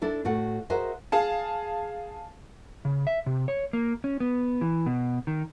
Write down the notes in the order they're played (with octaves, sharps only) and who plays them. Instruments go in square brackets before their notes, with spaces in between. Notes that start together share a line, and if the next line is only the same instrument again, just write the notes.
[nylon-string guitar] D4 E4 A4 D5
A2 F#4 A4 F#5
F#4 G#4 A#4 C5 D#5 E5
[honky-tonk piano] G#4 F5 A5
[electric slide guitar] C#3
E5
C3
C#5
A#3
C#4
B3
E3
B2
D#3